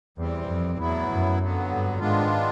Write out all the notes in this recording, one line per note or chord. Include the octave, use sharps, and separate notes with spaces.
E2 E3 G3 C4
F2
E2 A2 F#3 B3 E4
F#2
F2 D3 F#3 B3
G2
G#2 D#3 G#3 B3 D4 F4